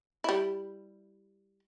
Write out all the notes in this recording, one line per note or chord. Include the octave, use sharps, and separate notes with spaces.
G3 E4